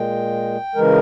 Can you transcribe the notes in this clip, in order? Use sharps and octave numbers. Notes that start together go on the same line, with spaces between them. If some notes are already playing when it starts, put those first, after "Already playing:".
Already playing: A#2 G#3 G5
C#3 E3 G#3 A#4